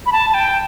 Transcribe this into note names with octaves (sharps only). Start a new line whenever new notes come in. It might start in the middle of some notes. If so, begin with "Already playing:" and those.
B5
A5
A5
G5